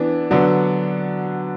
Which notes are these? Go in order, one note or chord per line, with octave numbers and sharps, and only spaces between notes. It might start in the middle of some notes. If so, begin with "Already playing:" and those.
Already playing: E3 B3 D4
D3 F#3 B3 D4